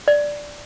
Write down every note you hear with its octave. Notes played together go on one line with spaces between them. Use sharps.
D5